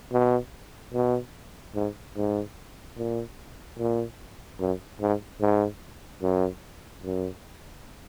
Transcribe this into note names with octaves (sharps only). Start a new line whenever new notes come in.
B2
B2
G#2
G#2
A#2
A#2
F#2
G#2
G#2
F#2
F#2